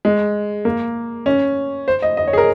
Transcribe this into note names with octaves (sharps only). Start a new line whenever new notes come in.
G#3
A#3
C#4
C5
D#5
D#5
C#5
G#4
A#4